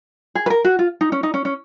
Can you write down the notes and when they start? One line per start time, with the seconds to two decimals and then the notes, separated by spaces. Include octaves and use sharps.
0.35 G#4
0.46 B4
0.50 A#4
0.64 F#4
0.79 F4
1.01 D#4
1.12 C#4
1.23 D#4
1.34 C#4
1.45 C#4